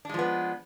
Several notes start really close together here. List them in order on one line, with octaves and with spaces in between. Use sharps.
D4 G#3 F3 B3